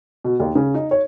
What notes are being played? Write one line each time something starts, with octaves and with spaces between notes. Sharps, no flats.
B2
D#2
C#3
D#4
C#5